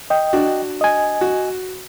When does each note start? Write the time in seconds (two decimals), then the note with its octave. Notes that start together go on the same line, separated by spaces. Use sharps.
0.10 D#5 G5
0.33 D4 F#4
0.81 D#5 G#5
1.21 F#4